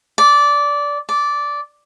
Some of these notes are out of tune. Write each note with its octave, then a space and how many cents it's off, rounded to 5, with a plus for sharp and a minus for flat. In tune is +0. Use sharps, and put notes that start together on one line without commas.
D5 -15
D5 -10